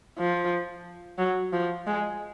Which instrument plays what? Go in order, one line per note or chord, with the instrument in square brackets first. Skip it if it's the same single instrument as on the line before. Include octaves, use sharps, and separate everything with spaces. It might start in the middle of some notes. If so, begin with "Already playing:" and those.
[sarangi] F3
F#3
F3
G#3